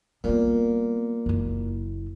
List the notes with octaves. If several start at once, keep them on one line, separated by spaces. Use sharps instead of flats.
A#2 G3 B3
F#1 E4